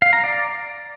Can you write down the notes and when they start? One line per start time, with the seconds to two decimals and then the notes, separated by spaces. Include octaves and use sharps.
0.02 F5
0.13 A#5
0.24 D5